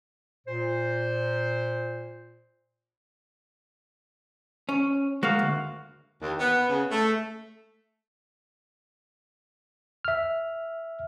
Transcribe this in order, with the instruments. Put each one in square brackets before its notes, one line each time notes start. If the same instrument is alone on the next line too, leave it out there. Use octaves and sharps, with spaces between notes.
[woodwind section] A#2 C5
[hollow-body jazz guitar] C#4
[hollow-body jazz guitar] G#3 A#3 [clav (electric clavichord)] F#4 F5
[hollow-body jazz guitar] D2
[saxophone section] D#2
B3
C#3
A3
[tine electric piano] E5 F6